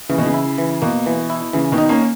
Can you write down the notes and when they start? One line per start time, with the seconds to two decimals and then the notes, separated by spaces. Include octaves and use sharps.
0.09 C#3 E3
0.18 B2
0.26 C#3
0.34 E4
0.58 E3
0.82 B2 A#3
1.06 E3
1.30 E4
1.53 C#3 E3
1.72 B2 D#3
1.78 D#4
1.89 A#3 C#4